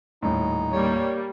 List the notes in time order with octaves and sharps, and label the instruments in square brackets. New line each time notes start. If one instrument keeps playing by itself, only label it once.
[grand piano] D#1 A2 [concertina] D#4
[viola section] G3 A#3 [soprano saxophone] C#5